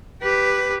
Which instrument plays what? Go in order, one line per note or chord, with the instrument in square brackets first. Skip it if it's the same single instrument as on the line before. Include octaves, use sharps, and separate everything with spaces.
[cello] G4 B4